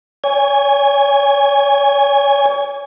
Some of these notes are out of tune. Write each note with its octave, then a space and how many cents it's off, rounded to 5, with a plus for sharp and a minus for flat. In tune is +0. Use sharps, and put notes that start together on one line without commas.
C#5 +30 G#5 -20